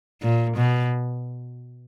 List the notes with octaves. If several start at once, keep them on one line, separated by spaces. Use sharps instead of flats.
A#2
B2